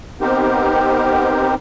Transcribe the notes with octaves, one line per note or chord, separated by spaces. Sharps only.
B3 C4 D#4 G4 A#4 C5